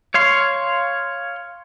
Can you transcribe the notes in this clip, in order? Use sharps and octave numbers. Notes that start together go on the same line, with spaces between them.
C#5 F5 C6